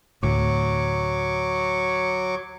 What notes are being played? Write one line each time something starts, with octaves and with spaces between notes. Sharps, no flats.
D2 A2 F#3 C#6 D6